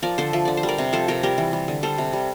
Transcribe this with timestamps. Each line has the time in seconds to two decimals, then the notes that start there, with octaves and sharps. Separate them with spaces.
0.02 F3 A#4 D5
0.18 D3 A4 C5
0.33 F3 E5
0.45 D3 D5
0.57 C5
0.63 G3
0.68 A#4 D5
0.78 C3
0.93 F3 A4 C5
1.08 C3 G4 A#4
1.23 G3 G4 A#4
1.38 E3
1.53 G3
1.68 D3
1.83 G3 A4 C5
1.98 C3
2.13 G3